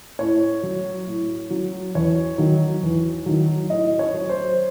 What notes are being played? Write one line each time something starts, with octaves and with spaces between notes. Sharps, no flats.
A2 C#5
F#3
A2
F#3
E2 C#5
D#3 F#3
E2
D#3 F#3
A2 D#5
C#5
F#3
C5